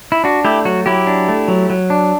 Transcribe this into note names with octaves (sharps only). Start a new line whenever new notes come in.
E4
D4 F#4
A3 E4 G4
F#3 F#4
F#3 E4 G4
D4
A3
F#3
F#3
D4